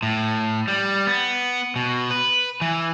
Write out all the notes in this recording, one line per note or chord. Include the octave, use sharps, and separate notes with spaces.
A2
G3
B3
B2
B4
E3